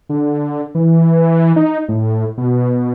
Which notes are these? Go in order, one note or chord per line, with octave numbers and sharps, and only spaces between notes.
D3
E3
D#4
A2
B2